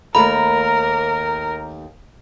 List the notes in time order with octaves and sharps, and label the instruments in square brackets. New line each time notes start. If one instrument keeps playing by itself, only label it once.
[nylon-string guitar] D#2 A3 [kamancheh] A#4 [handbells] A#5 [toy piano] B5